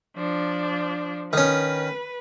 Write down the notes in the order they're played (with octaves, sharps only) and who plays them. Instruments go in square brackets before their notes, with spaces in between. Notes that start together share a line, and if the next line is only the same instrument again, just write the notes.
[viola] F3 D4
[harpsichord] D#3 C#4 [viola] B4